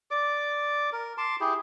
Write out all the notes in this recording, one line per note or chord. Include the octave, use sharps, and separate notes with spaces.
D5 D6
A#4
A5 C6 D6
E4 G4 G#4